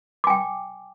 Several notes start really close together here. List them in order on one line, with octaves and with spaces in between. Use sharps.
D6 G#5 G5